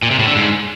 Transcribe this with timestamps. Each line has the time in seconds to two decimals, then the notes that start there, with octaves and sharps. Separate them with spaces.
0.03 A#2
0.11 C3
0.19 A2
0.27 D3
0.35 G#2